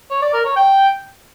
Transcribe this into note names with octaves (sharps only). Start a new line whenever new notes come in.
C#5
D5
A#4
C#5
G5